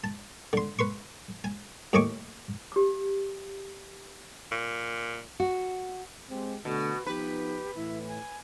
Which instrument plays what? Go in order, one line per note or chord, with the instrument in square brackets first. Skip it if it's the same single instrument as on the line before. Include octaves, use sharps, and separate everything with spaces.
[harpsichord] A5
D3 C6
B4 C6 C#6
G#5
D#2 A2 D#5 G#5 C#6 D6
[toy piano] G4 D6
[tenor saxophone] A#2
[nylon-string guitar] F#4
[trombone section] G#3 C4 G4
[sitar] B2 [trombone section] D3 A3 [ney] F#4
[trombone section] F3 B3 D#4 [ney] G4 [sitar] B4
[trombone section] A2 E3 [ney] E4
[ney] G#5